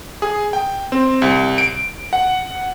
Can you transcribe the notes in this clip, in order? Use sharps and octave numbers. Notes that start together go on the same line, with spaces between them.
G#4
G5
C4
C2
D7
F#5